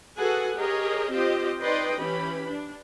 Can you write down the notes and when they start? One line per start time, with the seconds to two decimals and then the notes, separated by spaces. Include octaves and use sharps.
0.17 F#4 G#4 A4 B4 F#5 G#5
0.56 G4 G#4 A#4 C#5 D#5
1.10 C4 F4 G4 C5 D#5
1.60 D#4 B4 D5 D#5 G5 C6
1.97 E3 C#4 G4 B5
2.47 D4